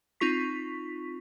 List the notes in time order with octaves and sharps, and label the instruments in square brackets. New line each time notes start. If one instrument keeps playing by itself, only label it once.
[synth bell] C4 D#4 F4 C#6 B6